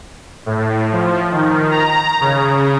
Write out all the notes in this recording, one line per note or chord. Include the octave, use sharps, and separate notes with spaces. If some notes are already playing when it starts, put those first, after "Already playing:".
A2
F3
D#3
A#5
C#3